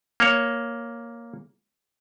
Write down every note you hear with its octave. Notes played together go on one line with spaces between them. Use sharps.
A#3 C#5